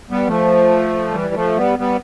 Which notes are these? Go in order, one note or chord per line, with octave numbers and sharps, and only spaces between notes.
G3 B3
F3 A3
E3 G3
F3 A3
G3 B3
G3 B3